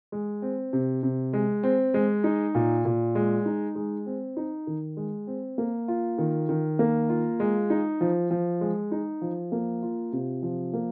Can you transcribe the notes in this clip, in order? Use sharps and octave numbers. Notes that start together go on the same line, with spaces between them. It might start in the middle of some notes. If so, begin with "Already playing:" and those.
G#3
C4
C3
C3
G#3
C4
G#3
D#4
A#2
A#2
G#3
D#4
G#3
C4
D#4
D#3
G#3
C4
A#3
F4
D#3
D#3
A#3
F4
G#3
D#4
F3
F3
G#3
D#4
F3
A#3
F4
C3
F3
A#3